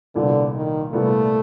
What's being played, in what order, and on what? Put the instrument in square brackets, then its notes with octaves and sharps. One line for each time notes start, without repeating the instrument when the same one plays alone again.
[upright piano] C2 A#2 G3 B3 [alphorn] D3
[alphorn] D#3
[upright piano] C2 A#2 G3 B3 [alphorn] A3